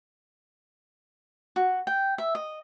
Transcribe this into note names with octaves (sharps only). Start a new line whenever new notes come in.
F#4
G5
E5
D#5